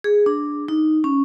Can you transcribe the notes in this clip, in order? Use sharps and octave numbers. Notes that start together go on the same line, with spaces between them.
G#4
D4
D#4
C#4